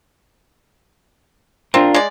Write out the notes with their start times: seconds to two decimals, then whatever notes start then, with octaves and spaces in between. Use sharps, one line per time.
1.74 C4 D4 F4 A#4
1.94 G#3 D5